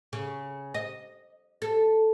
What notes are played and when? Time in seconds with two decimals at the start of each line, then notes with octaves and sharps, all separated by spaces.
0.13 C#3
0.74 D#5
1.62 A4